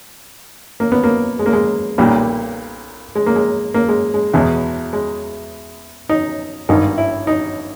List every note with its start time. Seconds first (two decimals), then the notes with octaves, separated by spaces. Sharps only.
0.80 A#3
0.92 B3
1.04 A#3
1.39 G#3
1.46 A#3
1.53 G#3
1.98 B1 A#2 G3 A#3
3.15 G#3
3.26 A#3
3.36 G#3
3.74 A#3
3.88 G#3
4.14 G#3
4.34 E2 B2 G#3
4.93 G#3
6.09 D#4
6.69 G#1 G2 D#3 D#4
6.98 E4
7.27 D#4